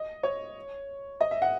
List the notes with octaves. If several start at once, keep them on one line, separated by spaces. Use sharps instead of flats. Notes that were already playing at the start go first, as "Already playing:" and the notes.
Already playing: D#5
C#5
D#5
E5
F#5